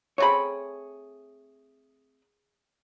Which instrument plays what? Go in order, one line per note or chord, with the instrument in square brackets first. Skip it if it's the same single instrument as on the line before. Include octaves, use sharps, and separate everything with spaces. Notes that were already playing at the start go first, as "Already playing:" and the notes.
[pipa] A3 C4 B5 [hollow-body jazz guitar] G#4 C#5